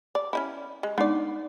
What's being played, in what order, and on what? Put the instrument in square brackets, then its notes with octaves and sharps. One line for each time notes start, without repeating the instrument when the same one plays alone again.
[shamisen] D5
C#4 D#4 E4
G#3
[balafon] G#3 D4 D#4 [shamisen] B3 D5